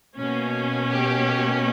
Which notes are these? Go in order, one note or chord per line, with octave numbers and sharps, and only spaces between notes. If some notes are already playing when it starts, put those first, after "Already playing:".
B2 A#3 C#4
G4